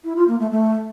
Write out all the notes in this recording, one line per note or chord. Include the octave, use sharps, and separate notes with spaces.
E4
F4
A#3
A3
A3